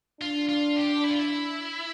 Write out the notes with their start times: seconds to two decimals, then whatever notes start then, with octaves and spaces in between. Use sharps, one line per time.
0.21 D4 F4
0.49 F4
0.76 G4
1.04 E4
1.11 F4
1.19 E4